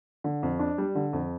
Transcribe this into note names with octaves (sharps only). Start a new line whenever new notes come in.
D3
F2
D4
G3
D3
F2